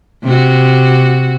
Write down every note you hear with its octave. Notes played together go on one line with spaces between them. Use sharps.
C3 F#4